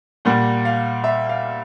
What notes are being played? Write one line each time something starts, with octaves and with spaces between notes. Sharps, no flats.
A#2 G3 A#3 F#5
F5
E5
F5